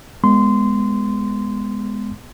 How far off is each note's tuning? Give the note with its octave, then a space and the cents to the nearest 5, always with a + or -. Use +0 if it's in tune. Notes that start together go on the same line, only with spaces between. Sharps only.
G#3 -10 B3 +0 C6 -20